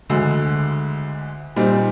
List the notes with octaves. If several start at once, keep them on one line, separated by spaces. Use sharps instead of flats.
D2 D3 G#3
A#2 G3 C4 D#4